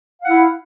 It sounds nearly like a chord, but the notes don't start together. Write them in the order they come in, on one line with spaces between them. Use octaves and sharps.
F5 F#5 E4